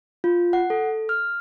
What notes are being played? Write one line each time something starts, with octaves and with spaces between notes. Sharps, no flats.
F4
F#5
A4
F6